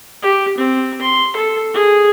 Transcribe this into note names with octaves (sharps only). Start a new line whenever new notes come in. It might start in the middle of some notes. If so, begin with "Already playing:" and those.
G4
C4
C6
A4
G#4